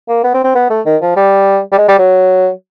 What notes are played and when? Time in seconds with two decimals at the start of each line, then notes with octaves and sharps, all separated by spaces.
0.09 A#3
0.24 B3
0.34 C4
0.44 C4
0.55 B3
0.70 A3
0.86 D#3
1.01 F3
1.16 G3
1.72 G3
1.78 G#3
1.88 G3
1.99 F#3